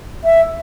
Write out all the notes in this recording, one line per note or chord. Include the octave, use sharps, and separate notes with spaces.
E5